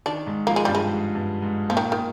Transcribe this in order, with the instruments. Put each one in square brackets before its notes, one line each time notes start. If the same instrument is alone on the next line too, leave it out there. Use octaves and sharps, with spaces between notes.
[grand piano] D#3 [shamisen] D4
[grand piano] G#2
[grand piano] F3 [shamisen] A#3
[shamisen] G#3
[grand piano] G2 [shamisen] G3
[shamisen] G#3
[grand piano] G#2
G2
G#2
[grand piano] A#2 [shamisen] F3
[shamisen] D#3
[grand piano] A#2 [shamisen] D#3